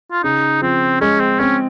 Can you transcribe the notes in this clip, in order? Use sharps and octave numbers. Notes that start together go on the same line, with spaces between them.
F4
C#3 D#4
F3 C4
G#3 C#4
C4
C4 C#4